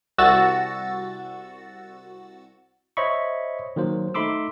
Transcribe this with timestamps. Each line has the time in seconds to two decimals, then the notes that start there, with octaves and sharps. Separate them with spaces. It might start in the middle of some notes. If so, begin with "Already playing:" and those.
0.18 C2 F#4 E6 A6
2.97 C5 C#5 D#5 E5 B5 C#6
3.76 D#3 F#3 A#3 C5
4.14 A3 D#4 B5 C6 D6 E6